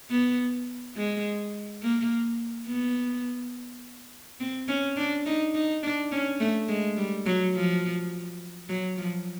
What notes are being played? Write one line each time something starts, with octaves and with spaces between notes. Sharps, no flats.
B3
G#3
A#3
B3
C4
C#4
D4
D#4
D#4
D4
C#4
A3
G#3
G3
F#3
F3
F#3
F3